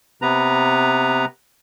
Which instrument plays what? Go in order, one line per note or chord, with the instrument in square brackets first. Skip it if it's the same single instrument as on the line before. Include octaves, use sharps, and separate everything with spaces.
[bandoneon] C3 B3 B4 A#5